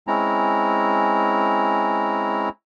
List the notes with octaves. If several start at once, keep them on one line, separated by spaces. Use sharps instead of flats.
G#3 C4 C#4 E4 A#5